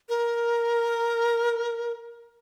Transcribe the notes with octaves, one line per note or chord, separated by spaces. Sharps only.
A#4